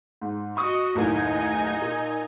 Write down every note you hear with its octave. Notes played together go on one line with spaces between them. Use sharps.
G#2
F#4 D#5 C#6 D#6
F#1 D#2 A2 D#4 D#5 G#5
A#2